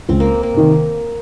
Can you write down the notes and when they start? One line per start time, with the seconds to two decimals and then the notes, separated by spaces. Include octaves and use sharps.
0.09 C#2 C4
0.20 A#3
0.43 A#3
0.54 C3 D#3